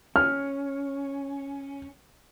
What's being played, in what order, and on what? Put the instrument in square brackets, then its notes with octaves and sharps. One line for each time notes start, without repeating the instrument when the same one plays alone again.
[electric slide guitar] C#4 [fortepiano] F6